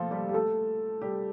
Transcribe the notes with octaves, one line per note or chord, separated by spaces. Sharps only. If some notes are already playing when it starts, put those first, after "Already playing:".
Already playing: F3 A3 A#3 F4 A4
G3 G4
G4
A3 A4
G3 G4